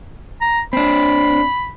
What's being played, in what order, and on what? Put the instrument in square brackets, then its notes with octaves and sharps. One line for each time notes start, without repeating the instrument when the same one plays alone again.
[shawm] A#5
[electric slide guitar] C4 D4 [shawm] B5